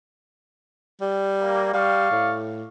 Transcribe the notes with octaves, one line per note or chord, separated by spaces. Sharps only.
G3
A#3
G3 D5 F5 C#6
A2